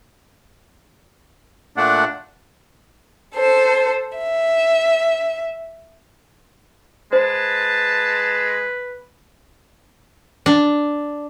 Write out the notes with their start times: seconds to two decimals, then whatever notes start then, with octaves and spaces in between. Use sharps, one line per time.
1.77 A#2 A3 D4 F#5
3.36 A4 C5
4.19 E5
7.13 G#3 B4 C5 A5
10.46 D4